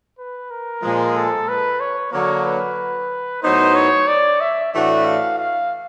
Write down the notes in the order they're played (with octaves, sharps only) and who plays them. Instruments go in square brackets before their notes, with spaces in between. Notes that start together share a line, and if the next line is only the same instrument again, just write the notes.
[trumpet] B4
A#4
[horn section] A#2 F3 G#3
[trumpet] A4
B4
C#5
[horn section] D3 F#3 A#3 [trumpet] C#5
[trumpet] B4
[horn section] A2 F#3 B3 D#4 [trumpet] C5
[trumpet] C#5
D5
E5
[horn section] A2 E3 A3 D4 F#4 [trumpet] E5
[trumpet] F5
F5